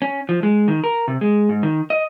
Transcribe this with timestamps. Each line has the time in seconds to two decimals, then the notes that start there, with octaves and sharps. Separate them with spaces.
0.02 C#4
0.29 F3
0.43 G#3
0.68 D#3
0.84 A#4
1.08 C3
1.21 G#3
1.49 G#2
1.63 D#3
1.90 D#5